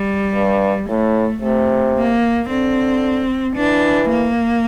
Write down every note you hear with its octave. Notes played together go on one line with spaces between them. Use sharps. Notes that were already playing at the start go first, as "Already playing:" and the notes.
Already playing: G3
G2
A2 A3
C3 A3
A#3
D3 C4
E3 D4
A#3